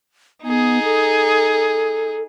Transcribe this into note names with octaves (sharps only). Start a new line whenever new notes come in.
B3 D#4 G#4
A4